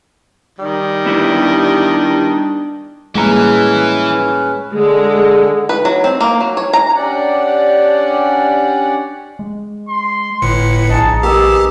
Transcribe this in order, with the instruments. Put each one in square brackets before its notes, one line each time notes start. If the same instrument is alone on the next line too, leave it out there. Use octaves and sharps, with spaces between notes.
[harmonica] D#3 [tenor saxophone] G3
[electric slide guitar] B3 E4 G4 [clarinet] D4
[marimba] A2 G3 A#3 [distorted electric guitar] E3 [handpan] G#3 [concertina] C#4 B4
[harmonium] D3 [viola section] G#3
[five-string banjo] B4
F#3
C4
A#3
F#3
C#5
A#5
[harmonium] C#4 D4 G4 D5 F#5
[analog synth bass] G#3
[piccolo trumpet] C6
[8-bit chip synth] G1 A2 C#7 [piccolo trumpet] B4
[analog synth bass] A#1 [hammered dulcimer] D#4 G#4 [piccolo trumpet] A5
[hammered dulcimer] D#3 B3 [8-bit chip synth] G4 [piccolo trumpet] E6